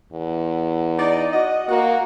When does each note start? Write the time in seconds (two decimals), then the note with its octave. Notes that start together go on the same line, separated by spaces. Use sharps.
0.12 E2
0.98 D#4 D5
1.33 F#4 D#5
1.68 A#3 F#4